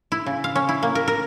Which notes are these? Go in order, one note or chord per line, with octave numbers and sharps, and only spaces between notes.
E4
C#3
F5
C#4
E4
A#3
A#4
A#4